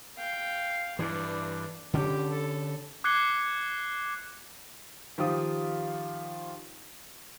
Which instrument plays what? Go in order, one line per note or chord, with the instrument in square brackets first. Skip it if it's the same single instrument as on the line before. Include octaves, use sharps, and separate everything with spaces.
[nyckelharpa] F5 G5
[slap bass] G2 E3 [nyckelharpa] D4
[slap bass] D3 C#4 [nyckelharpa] G4
[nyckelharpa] A4
[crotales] D6 F#6 G#6 C7 C#7 G7
[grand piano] D#3 F3 F4 G4 D#6